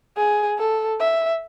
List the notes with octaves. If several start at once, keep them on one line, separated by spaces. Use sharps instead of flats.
G#4
A4
E5